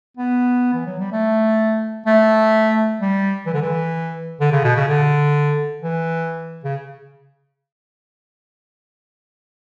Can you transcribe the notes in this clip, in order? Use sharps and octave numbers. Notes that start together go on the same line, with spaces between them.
B3
E3
F#3
G3
A3
A3
G3
E3
D3
E3
D3
C#3
B2
C#3
D3
E3
C#3